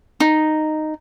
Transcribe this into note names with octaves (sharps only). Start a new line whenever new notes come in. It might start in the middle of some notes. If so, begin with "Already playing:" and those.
D#4